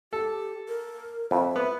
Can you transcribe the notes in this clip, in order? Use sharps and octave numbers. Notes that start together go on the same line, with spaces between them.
G4 A4
A#4
F2 E5
B3